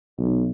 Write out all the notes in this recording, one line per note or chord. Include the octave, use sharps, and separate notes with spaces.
B1